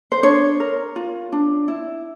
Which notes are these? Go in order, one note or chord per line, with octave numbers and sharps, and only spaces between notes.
C5
D4 C#5
A#4
F4
D4
E4